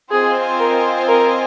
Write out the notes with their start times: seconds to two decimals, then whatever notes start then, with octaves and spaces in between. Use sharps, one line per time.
0.11 C4 F4 G#4 C5 D#5 G#5
0.60 A#4
1.08 A#4